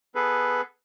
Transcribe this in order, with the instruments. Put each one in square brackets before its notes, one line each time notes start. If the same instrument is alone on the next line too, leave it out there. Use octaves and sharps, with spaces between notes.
[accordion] B3 G#4 A4 B4